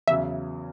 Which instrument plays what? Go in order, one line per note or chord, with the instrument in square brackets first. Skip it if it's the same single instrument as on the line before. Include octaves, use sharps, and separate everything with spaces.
[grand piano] E2 C#3 F#3 [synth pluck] E5